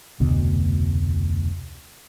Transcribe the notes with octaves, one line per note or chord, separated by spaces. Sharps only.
F1 D2 B2